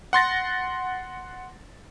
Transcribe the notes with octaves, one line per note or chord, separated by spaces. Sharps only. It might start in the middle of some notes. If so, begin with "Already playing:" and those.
F#5 C6 A6 A#6